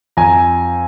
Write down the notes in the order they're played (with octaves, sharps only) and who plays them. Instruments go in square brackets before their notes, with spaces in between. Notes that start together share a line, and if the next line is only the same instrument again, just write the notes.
[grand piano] F2 G#5 A#5